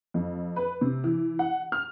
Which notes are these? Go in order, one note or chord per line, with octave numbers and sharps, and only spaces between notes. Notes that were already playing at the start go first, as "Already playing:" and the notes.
F2
B4
C3
E3
F#5
F6